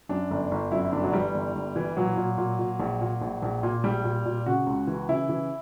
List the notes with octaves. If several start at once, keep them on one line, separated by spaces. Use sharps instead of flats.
F#2 D4
G1
G1
F#2 E4
G1 D4
F#3
E3 G3
G1
G1
E3
A#2 F#3
A#2
A#2
A#2
A#1
A#2
A#1
A#1
A#2
A#1 G3
A#2
A#2
C#3 F#4
C#2
E3
C#3 E4
E3